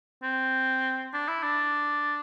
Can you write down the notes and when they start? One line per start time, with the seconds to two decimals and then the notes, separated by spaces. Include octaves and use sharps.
0.23 C4
1.13 D4
1.28 E4
1.43 D4